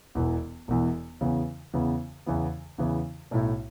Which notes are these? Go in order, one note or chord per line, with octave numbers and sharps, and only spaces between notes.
E1 E2 E3
E1 E2 E3
E2 C#3 E3 B3
E2 C#3 E3 B3
E2 C#3 E3 B3
E2 C#3 E3 B3
B1 A2 A3 E4